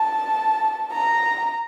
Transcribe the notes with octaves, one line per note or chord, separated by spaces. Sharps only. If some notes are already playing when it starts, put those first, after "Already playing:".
Already playing: A5
A#5